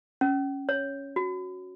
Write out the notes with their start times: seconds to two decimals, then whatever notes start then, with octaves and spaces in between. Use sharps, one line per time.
0.21 C#4
0.69 C#5
1.16 F#4